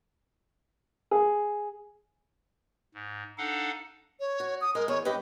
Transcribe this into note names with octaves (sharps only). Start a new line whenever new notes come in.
G#4
G#2
D4 D#4 A4 F5 F#5
C#5
F#4
D#6
G#3 A#4
E2 C#5
G2 G4 B4 D#5